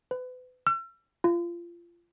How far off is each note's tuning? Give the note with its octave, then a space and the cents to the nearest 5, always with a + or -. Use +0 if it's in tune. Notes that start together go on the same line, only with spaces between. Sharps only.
B4 +35
E6 +40
F4 -25